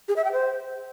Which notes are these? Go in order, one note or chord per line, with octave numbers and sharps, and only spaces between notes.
G#4
E5
G5
C5